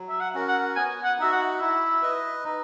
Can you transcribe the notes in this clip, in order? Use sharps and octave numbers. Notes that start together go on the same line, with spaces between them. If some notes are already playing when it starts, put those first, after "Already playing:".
Already playing: F#3
E5
F#5
C#4 F#4 A#4
F#5
B3 G#5
F#5
D#4 F#4 E5
F#5
E4 E5
B4 D#5
D#4